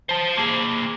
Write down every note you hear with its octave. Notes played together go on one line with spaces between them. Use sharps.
C5 A5
A#3 G#4